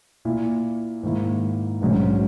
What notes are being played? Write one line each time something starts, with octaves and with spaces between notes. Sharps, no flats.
A#2 A#3 E4
G#2 D#3 A#3 E4
A#1 G#2 F#3 C#4